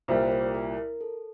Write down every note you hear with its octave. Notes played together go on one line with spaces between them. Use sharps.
C2 A#2 G3 C5
D5
A#4
A#4
A4